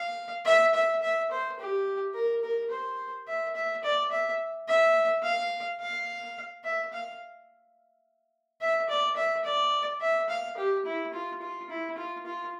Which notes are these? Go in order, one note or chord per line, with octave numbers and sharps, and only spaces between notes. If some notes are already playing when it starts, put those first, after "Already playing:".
Already playing: F5
E5
E5
E5
C5
G4
A#4
A#4
C5
E5
E5
D5
E5
E5
F5
F5
E5
F5
E5
D5
E5
D5
E5
F5
G4
E4
F4
F4
E4
F4
F4